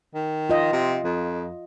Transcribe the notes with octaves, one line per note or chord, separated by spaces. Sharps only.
D#3
F4 D#5
C3
F2